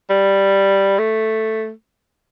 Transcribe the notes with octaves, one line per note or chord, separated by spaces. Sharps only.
G3
A3